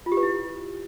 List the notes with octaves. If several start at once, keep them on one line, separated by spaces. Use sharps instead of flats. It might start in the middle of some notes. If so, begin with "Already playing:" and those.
F4
G4
B4
E4